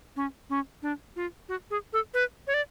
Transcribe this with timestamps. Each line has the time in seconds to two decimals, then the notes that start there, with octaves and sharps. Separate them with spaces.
0.16 C#4
0.50 C#4
0.82 D4
1.16 F4
1.49 F#4
1.71 G#4
1.93 A4
2.14 B4
2.47 C#5
2.54 D5